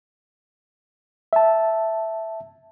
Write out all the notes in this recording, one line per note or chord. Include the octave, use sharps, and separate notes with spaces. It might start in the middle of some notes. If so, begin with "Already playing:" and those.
E5 A5